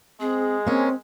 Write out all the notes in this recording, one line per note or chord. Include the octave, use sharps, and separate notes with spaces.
G#3 C4 G#4
A#3 C4 C#4